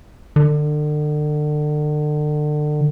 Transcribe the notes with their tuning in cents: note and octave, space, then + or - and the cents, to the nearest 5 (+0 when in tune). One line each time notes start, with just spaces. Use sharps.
D3 +35